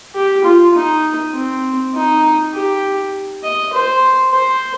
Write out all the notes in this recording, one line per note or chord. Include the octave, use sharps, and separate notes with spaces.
G4
F4
D#4
C4
D#4
G4
D#5
C5
C5